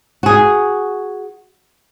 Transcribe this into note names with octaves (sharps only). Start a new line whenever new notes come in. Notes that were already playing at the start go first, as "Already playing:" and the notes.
F#4 G#4